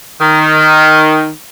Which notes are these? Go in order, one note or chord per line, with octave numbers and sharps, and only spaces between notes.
D#3